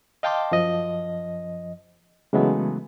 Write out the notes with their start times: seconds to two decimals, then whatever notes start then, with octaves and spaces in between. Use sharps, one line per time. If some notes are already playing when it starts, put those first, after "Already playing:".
0.23 D#5 F5 G5 A5 C6 D6
0.51 F#2 F3 D#5
2.33 C#3 E3 F#3 G#3 A3 B3